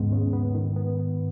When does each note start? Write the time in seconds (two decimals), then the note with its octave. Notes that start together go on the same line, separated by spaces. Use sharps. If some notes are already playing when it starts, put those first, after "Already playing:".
Already playing: D#2 G#2 C#3 G#3 B3
0.12 C#3
0.33 B3
0.54 D#3
0.76 B3